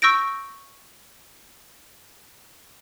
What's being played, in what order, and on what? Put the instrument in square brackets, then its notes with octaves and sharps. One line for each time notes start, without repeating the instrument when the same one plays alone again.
[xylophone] C#6 E6 G6 A#6 D7